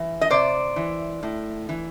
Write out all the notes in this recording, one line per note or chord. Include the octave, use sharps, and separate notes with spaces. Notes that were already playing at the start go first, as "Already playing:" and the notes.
Already playing: E3
D#5
C3 C5 D5
E3
A2
E3